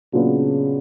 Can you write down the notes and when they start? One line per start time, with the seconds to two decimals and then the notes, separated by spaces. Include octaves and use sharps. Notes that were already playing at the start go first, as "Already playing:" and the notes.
0.13 A#2 C#3 F#3 B3 D4 F4